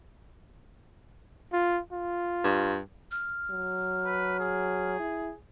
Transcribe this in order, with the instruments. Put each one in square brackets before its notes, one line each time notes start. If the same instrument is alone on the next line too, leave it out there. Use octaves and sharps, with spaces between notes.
[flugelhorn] F4
F4
[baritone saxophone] G2
[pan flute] F6
[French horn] F#3
[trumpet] B4
G#4
[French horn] E4